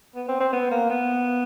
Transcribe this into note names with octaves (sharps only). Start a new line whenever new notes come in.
B3
C4
C4
B3
A#3
B3